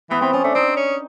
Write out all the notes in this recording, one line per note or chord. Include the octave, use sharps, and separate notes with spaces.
E3 B3
E3 C4
F3 C#4
A3 D4
C4 D#4
C#4